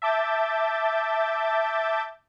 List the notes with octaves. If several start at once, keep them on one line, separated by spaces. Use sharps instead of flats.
E5 A5 D6 G6 A6